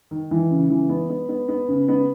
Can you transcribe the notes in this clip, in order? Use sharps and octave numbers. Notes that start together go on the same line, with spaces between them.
D#3
E3
C#3
E3
B3
B3
B3
B3
C#3
B3